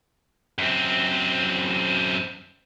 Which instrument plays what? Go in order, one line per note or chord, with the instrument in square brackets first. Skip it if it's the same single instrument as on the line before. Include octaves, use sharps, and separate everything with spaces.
[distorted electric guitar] F#2 C4